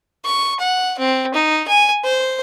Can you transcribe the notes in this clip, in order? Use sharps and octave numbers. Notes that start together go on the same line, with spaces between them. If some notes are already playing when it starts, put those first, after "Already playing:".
C#6
F#5
C4
D#4
G#5
C5